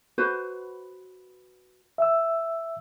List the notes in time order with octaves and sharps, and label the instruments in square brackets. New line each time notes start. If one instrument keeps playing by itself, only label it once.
[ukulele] F#4 B4 C5
[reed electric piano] E5 E6